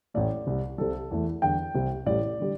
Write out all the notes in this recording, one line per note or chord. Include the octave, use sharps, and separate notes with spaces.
A1 A2 A3 D5
C2 C3 G3
C2 C3 G3 A4
E2 E3 A3
E2 D3 G3 G5
C2 C3 G3
A1 A2 G3 D5
D3 G3